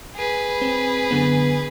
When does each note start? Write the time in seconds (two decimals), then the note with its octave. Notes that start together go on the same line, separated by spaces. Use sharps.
0.16 G#4 B4
0.61 C4
1.11 F#2 D3 B3